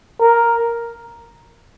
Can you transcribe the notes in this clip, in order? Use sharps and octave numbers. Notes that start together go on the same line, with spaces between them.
A#4